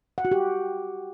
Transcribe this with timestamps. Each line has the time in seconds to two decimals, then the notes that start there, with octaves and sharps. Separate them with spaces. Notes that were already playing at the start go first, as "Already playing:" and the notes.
0.18 F#5
0.25 F#4
0.31 G4